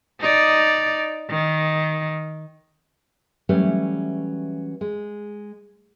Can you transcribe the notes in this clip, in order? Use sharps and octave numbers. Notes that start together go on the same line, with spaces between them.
D#4 D5
D#3
E3 F#3 G3 A3 C#4 B4
G#3